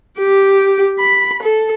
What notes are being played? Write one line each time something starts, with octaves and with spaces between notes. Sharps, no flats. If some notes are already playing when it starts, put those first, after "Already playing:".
G4
B5
A4